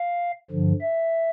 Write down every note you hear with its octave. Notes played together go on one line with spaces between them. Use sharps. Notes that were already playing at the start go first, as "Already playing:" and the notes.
Already playing: F5
G2 D3 F3
E5